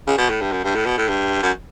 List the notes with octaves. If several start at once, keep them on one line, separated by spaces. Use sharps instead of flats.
C#3
B2
A2
G2
F#2
G2
A2
B2
A2
G2
F#2